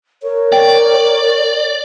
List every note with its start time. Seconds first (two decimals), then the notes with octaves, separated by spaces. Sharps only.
0.23 A#4 C#5
0.52 D5 G5